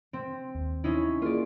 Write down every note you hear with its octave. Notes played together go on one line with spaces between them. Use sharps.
C4
D#2
C#4 D#4 E4
A#3 F4 G#4 D5